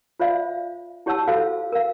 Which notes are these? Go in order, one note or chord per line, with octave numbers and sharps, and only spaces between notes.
F4 C5 D5 E5 F5
E4 G4 C#5 F#5 A5 E6
F#4 A4 C5 F5
A#4 F5